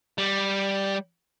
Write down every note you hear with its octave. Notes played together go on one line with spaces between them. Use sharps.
G3